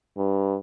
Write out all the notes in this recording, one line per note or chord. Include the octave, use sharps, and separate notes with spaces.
G2